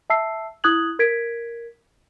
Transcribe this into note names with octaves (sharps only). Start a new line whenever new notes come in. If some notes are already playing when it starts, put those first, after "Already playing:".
E5 A5 E6 C7
E4 D#6 F#6 G#6 F#7
A#4 G#6 B6 D7